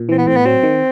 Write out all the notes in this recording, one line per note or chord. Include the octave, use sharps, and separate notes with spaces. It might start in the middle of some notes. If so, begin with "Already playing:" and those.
Already playing: A#2
E3 C4
B3
A2 C4
B3
F#3 C4
D#3